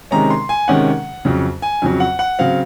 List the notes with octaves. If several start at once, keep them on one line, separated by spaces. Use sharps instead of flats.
C3 D#3 G#3 C#4 A#5
C6
G#5
C3 D#3 G#3 C#4 F#5
F2 C#3 F#3
G#5
F2 C#3 F#3
F#5
F#5
C#3 F#3 C4 F5